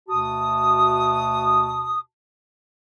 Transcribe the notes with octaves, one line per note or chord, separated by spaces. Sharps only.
D2 B2 F#4 A5 D#6